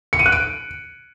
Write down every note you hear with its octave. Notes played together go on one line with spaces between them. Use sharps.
C#7
D#7
F#6
D7